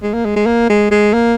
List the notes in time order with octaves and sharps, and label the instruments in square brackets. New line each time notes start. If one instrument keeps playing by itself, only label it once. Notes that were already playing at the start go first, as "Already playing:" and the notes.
[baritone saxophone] G#3
A#3
G#3
G#3
A#3
G#3
G#3
A#3